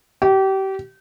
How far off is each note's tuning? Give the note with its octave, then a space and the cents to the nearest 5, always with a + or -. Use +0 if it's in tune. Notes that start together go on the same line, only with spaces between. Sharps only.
G4 -30